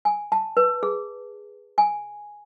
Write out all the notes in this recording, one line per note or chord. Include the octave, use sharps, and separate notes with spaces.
G#5
A5
B4
G#4
G#5